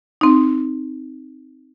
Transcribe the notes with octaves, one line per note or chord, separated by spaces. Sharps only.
C4 D#4